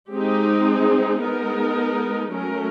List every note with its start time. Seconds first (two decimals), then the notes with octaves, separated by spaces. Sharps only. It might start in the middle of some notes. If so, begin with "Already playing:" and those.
0.11 G#3 C4 D#4 G4
0.67 G#4
1.21 G#3 B3 D#4 A#4
2.32 F#3 A3 C#4 A#4